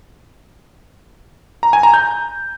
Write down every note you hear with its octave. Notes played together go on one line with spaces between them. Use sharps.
A#5
G#5
A#5
G6